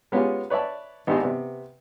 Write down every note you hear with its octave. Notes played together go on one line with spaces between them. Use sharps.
G#3 B3 C#4 F4 G4
B4 C#5 D5 E5 A5
G#1 B3 D4 D#4 G4 C6
C3 B3